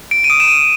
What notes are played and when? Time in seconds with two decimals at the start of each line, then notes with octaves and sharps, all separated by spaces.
0.11 D7
0.24 D#7
0.30 D#6 D7
0.40 E7
0.48 D#7